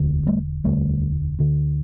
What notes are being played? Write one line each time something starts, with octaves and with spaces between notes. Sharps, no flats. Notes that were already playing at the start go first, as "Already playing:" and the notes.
Already playing: E1 D2 D3
G3 A3
E1 D2 D3 G3 A3
D2 D3